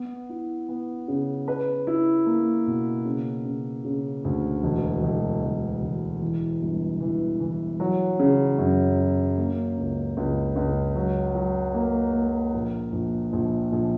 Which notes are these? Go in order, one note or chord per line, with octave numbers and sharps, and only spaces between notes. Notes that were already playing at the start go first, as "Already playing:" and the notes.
Already playing: B3
E4
B3
C#3
B4
E4
A#3
B2
C#3
C#3
C#3
D2
E1
E1
E1
E1
E3
G1
E3
E3
F#3
C#3
F#2
F#3
A#3
C#2
C#2
C#2
F#3
F#3
A#3
A#3
A#1
A#1
A#1
A#1